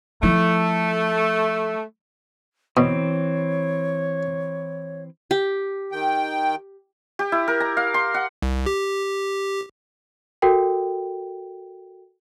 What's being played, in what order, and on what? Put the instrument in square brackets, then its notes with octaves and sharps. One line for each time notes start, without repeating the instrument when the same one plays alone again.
[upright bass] F3 E4 [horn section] A3
[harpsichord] B2 [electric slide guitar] E3 C4 [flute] C#5
[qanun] G4
[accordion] D#3 G5
[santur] G4
E4
A#4
A#5
F5
C6
F#5
[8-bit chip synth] C2
G4
[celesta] F#4 A4 A#4 G5